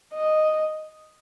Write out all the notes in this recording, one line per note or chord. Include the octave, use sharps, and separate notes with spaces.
D#5